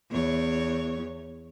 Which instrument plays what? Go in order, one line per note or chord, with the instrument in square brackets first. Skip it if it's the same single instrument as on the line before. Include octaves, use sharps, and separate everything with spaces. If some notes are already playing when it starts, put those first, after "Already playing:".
[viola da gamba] E2 C#5